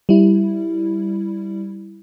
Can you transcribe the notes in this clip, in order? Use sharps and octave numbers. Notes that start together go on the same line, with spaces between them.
G3 E4